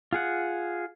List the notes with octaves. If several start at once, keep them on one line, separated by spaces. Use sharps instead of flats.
F4 G#4 F#5